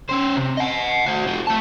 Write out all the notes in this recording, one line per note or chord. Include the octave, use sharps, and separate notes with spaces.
C#4 C5
C3
D#5 F#5
F#4 C5
F4 G4
A3 A5